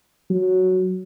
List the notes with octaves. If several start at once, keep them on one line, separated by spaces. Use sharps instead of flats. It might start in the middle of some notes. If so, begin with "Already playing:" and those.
F#3